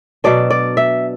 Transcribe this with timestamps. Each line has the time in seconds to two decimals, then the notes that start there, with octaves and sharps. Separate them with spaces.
0.24 B2 F#3 D4 D5
0.50 D5
0.77 E5